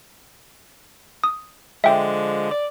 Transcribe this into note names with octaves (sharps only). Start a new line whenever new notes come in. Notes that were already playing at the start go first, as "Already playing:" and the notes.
D#6
D3 F3 G#3 E5 G5
D5